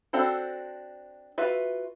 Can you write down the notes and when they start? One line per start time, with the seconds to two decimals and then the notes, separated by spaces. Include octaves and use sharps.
0.13 C4 D4 F#4 A4 C5
1.38 F4 F#4 B4 E5